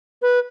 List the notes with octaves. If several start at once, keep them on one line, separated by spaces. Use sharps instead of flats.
B4